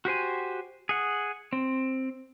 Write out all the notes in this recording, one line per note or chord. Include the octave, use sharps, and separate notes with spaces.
F#4 G4 C5 G#5
G#4 F#5
C4